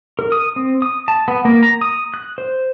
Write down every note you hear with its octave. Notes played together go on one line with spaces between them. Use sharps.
A#4
D#6
C4
D#6
A5
B3
A#3
A#5
D#6
F#6
C5